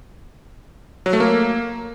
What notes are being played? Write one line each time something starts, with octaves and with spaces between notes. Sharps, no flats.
F#3
A3
A#3